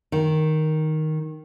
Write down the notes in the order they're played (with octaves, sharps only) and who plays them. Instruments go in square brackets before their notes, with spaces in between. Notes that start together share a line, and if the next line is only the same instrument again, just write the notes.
[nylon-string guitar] D#3